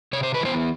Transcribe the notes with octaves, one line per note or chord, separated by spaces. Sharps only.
C3 C#5
C5
B4
E3 G#3 B3 C5